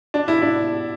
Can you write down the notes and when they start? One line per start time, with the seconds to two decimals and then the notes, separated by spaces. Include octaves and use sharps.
0.14 D4
0.28 E4
0.42 D4